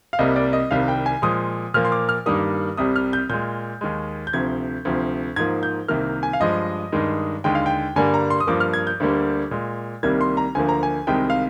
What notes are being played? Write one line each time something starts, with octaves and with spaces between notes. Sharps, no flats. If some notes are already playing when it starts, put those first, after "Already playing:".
F5
C2 C3 G3 A#3 D#5
D5
D#5
C2 C3 D#3 G3 F5
G5
G#5
A#2 F3 G#3 D#6
A#2 F3 A#3 F6
C6
D6
F6
G2 D#3 G3 A#3 D#6
C2 C3 G3 D#6
F6
G6
A#2 G#3 G6
D#2 D#3 G#3
G6
D2 C3 F3 G#6
D2 C3 F3
G#2 F3 A#3 G#6
G6
C2 C3 D#3 A#3 F6
G#5
F5
G2 F3 G#3 D#5
G2 D#3 G#3
D#2 D3 G#3 G5
F5
G5
G2 D3 G3 A#3 G#5
A#5
C6
D#6
G2 F3 A#3 D6
F6
G#6
G6
D2 D3 G3 A#3
A#2 G#3
C2 C3 D#3 G3 A#3 G#6
C6
A#5
D2 D3 F3 A#3 G#5
A#5
G#5
C2 C3 D#3 G#3 G5
F5